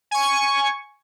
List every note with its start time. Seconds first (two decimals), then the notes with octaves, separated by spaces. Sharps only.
0.11 G#5 C#6